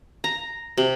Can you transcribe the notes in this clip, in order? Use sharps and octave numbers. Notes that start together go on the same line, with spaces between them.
A#5
C3